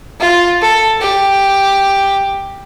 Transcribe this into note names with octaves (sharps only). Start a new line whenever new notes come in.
F4
A4
G4